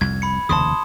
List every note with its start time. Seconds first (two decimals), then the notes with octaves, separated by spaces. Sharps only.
0.01 C2 F2 G#6
0.22 B5 C#7
0.49 F1 D#2 C#3 A5 C6 D#6